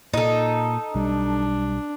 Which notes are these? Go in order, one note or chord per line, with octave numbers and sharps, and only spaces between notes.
A#2 D#4 A4
B1 G3 D4